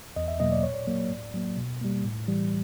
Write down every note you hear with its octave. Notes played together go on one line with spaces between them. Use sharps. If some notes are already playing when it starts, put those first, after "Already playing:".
E2 D#5
E5
B2 F#3 A#3 D#5
D5
A#2 C#5
D5
F#3 A#3
A2
F#3 A#3
B2
G3 A#3
A2
E3 G3